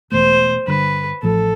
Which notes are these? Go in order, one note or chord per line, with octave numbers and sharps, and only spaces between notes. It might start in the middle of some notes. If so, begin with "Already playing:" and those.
E1 E2 B2 A3 C5
G2 D3 G3 B4
A1 A2 F3 A4